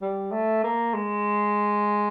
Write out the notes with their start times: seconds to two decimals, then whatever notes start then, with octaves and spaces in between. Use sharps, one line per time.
0.01 G3
0.32 A3
0.64 A#3
0.94 G#3